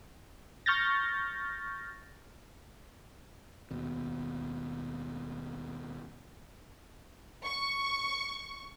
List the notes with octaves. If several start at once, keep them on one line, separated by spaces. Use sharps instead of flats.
C#6 F6 G6 A6 A#6
D#2 B2
C#6